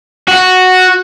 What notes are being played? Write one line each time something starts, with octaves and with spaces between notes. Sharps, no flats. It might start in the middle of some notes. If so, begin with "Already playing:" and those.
F#4